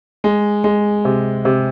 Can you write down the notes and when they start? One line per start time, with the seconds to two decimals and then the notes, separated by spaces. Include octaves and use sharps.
0.24 G#3
0.64 G#3
1.05 C3
1.45 C3